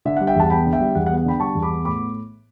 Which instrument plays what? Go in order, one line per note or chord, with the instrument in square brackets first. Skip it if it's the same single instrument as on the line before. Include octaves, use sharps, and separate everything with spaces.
[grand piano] D3 E5
G3 F#5
E5 G5
E2 F#5 A5
B3 G5 B5
D3
E5 G5
G3
E2 F#5
F#5
B3
F#5
D3 G5 B5
G3 A5 C#6
E2
B5 D6
B3
A2 B5 D6